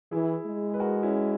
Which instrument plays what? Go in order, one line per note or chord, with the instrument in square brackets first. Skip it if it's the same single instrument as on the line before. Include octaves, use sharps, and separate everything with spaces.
[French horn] E3 [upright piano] E4 G#4
[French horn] G#3
[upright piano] B4
F#4 A#4
C#4 E4